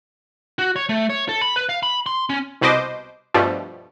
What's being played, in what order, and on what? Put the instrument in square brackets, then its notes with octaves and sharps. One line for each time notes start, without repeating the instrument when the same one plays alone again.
[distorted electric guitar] F#4
C#5
A3
C#5
A4
B5
B4
F5
B5
C6
C#4
[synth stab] C2 B2 B4 C5 D#5 D6
G2 B2 F3 G3 A3